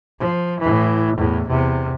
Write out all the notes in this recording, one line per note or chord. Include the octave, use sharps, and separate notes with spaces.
F3
A2 E3
E2 A2
E2 C3